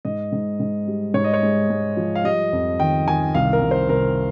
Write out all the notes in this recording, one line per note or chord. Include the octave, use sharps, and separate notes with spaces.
G#2 D#5
G#2
G#2
G3
G#2 C#5
D#5
C#5
G#3
G#3
F3
F5
G3 D#5
F2
D#3 G5
D#3 G#5
C2 F5
A#4
C2
C5
C2 A#4